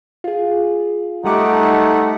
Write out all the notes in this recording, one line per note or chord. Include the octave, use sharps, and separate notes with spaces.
F4 G#4
G3 A3 D#4 G4 F#5 D6